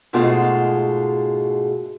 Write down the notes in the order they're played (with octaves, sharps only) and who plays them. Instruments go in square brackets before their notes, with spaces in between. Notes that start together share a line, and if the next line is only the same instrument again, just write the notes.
[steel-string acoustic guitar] G#2 B2 G#3 A3 F4 F#4